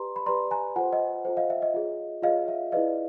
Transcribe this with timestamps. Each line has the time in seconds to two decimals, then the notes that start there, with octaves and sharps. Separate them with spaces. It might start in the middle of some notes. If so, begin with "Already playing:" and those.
Already playing: G4 B4 D5 A#5 C6
0.16 B5
0.26 G4 B4 D5 A#5 C6
0.51 G#5 A#5
0.76 F4 A4 C5 F#5 G#5
0.93 D#5
1.25 F4 A4 C5
1.37 D#5 F5
1.50 E5
1.62 D#5
1.74 F4 G#4 C#5
2.22 F4 G#4 C#5 D#5 F5
2.48 E5
2.72 E4 G#4 B4 D5 D#5 F5